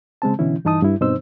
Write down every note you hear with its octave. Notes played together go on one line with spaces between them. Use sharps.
C#3 G#3 C4 A5
B2 D3 E3 C#4 E4
G2 E3 D#4 A5 D#6
G2 E4
G2 B2 C4 D#4 C5 E6